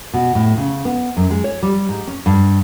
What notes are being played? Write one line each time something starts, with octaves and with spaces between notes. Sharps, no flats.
B2
A2
C#3
B3
F#2
G#3
C#5
G3
G#2
C#4
G2